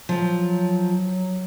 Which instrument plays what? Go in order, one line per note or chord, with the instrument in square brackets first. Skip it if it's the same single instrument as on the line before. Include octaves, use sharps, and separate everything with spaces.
[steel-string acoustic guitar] F3 [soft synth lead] F#3